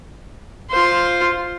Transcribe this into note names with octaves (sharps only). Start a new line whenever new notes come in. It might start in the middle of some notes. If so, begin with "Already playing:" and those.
F4 C5